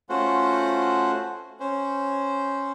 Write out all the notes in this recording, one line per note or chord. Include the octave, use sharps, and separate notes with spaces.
A3 C#4 F4 F#4 C5 F#5
C#4 C5